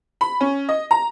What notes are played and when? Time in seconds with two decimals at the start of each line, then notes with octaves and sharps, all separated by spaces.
0.21 B5
0.41 C#4
0.69 D#5
0.91 A#5